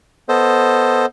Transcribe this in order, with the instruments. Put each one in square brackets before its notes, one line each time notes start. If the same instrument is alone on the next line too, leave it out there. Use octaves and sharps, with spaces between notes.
[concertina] B3 A4 C5 D#5